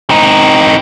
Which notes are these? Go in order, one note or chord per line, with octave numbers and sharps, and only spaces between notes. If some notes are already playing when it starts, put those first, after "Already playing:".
C4 D#4